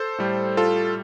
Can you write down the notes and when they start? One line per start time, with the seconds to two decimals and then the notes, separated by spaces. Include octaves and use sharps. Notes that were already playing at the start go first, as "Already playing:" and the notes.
Already playing: A4 C5
0.18 A2 G3
0.57 F4 A4